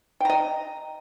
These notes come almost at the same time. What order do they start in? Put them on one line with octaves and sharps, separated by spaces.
G5 A#5 D#5